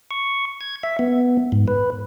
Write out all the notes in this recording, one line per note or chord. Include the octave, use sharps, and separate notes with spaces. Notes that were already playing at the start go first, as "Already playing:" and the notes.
C#6
G#6
E5
B3
G#2
B4